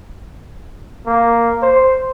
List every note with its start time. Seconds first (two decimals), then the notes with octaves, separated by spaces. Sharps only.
1.07 A#3
1.62 C5